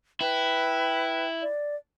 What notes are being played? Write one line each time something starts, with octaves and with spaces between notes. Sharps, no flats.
E4 B4 G5
D5